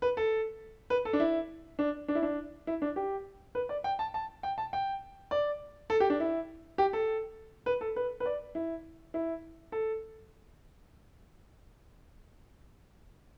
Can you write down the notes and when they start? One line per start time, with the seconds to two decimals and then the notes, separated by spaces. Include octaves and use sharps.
0.02 B4
0.17 A4
0.90 B4
1.05 A4
1.13 D4
1.20 E4
1.79 D4
2.08 D4
2.15 E4
2.22 D4
2.67 E4
2.82 D4
2.96 G4
3.55 B4
3.69 D5
3.84 G5
3.99 A5
4.14 A5
4.43 G5
4.58 A5
4.73 G5
5.31 D5
5.90 A4
6.00 G4
6.10 D4
6.20 E4
6.78 G4
6.93 A4
7.66 B4
7.81 A4
7.96 B4
8.20 B4
8.26 D5
8.55 E4
9.14 E4
9.72 A4